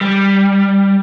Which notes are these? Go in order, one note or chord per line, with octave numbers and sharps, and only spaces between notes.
G3